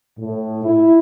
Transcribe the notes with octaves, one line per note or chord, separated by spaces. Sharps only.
A2
E4